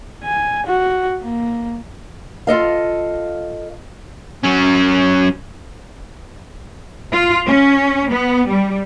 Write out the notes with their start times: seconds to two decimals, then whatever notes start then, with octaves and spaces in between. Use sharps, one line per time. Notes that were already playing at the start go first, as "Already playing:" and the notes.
0.24 G#5
0.67 F#4
1.22 A#3
2.47 F4 A4 D#5 F5
4.44 F#3 C#4
7.12 F4
7.46 C#4
8.11 B3
8.47 G3